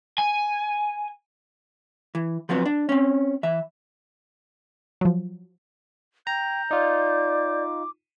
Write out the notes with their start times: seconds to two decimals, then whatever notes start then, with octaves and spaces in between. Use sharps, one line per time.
0.18 G#5
2.15 E3
2.49 F3 F#3 B3 C4
2.66 D4
2.89 C4 C#4
3.43 E3 E5
5.01 F3 F#3
6.27 G5 A#5 G6
6.71 D#4 F4 D5 D6